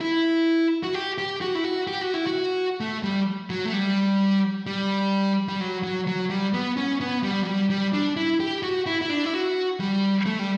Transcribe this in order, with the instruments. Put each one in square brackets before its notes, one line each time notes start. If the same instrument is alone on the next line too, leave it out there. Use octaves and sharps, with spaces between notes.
[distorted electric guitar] E4
F#4
G4
G4
F#4
E4
F#4
G4
F#4
E4
F#4
A3
G3
F#3
A3
G3
G3
G3
F#3
F#3
F#3
G3
B3
C#4
B3
G3
F#3
G3
G3
D4
E4
G4
F#4
E4
E4
D4
E4
F#4
G3
A3
G3